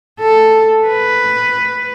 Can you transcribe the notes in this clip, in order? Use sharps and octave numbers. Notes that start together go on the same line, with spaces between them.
A4
B4